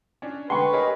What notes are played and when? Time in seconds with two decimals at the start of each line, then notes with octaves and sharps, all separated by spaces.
0.22 C#4 D4
0.50 D3 G#3 B4 F#5 G5 C6 C#6
0.73 G4 G#4 A#4 C#5 D#5